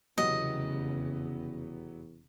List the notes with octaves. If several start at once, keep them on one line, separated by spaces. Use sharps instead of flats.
F1 E2 C#3 F#3 B3 G4 D#5